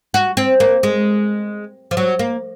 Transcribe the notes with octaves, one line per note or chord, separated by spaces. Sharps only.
F#4
C4
A#3
G#3
F3
F#3
A#3